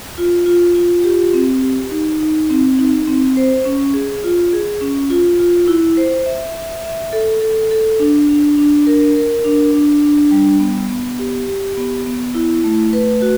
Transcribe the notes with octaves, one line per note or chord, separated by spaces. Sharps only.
F4
F4
F4
G4
C4
G4
D#4
D#4
C4
D#4
C4
C5
C#4
G#4
F4
G#4
C#4
F4
F4
E4
C5
E5
E5
E5
A4
A4
A4
D4
D4
D4
A#4
A#4
D4
D4
D4
G3
B3
B3
G4
G4
B3
B3
E4
A3
B4
F#4